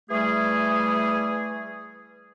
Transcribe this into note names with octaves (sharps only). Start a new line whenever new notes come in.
E3 G3 A3 G#4